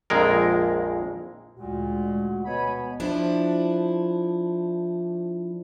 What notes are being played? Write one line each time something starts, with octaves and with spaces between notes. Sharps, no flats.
A#1 F2 G#3 A#4
D2 A#2 G#3 F#4
B2 C#5 G#5 B5
F3 D4 E4